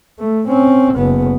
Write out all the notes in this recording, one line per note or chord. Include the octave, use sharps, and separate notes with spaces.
A3
C4 C#4
F#1 B3